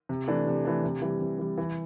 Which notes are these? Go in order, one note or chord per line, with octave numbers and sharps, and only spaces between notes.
C3
E3 A3 D4
C3
E3 A3 D4
C3
E3 G3
C3
E3 G3
E3